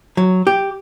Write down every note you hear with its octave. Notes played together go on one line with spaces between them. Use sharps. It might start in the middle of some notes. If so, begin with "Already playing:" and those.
F#3
G4